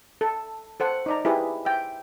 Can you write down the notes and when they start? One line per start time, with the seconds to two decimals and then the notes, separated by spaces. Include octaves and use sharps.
0.21 A4
0.80 A4 C5 F#5
1.06 D#4 D5 A#5
1.25 E4 G4 G#4 B4 D#5
1.65 E5 G5